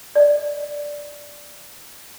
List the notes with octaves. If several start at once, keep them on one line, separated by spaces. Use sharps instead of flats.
D5 D#5